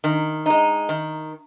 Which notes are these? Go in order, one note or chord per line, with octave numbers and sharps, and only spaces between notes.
D#3
G#3 D#4
D#3